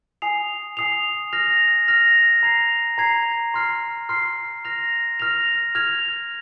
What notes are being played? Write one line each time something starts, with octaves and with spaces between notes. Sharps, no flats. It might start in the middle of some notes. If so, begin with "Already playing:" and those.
G#5 D#6 C7 F7
G#5 D#6 C7 F7
F6 A#6 F7
F6 A#6 F7
A#5 G#6 C7 F7
A#5 G#6 C7 F7
C6 F6 C7
C6 F6 C7
F6 A#6 F7
F6 A#6 F7
F6 G#6 F7